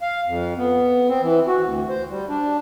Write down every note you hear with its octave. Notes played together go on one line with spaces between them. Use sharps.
F5
F2
B3
C4
E3
F#4
D2
C5
G3
D4